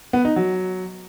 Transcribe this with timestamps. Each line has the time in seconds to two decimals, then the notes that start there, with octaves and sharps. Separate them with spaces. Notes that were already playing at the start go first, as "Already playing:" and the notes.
0.13 B3
0.25 D#4
0.36 F#3